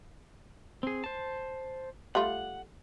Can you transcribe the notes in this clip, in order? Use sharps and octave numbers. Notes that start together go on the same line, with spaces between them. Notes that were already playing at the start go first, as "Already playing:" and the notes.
C4 G#4
C5 A5
G3 A3 F4 F#5